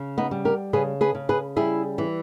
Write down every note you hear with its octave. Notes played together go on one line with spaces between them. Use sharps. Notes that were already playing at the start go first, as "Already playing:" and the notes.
Already playing: C#3
B3 D#4
G3
G4 A#4
C#3 G#4 B4
G#4 B4
C#3
G#4 B4
G3 E4 G#4
E3